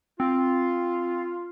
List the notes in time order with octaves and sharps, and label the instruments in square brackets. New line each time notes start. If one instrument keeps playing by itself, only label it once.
[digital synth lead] C4 [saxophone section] F4